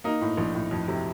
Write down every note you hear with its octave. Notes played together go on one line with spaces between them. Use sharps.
A#3 D#4
A2
A#1
A2
F2
C3